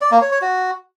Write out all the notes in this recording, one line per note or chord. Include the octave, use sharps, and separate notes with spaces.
D5
A#3
C#5
C#5
F#4